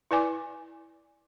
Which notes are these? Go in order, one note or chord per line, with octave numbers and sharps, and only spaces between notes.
E4 B4 D5 G#5 D6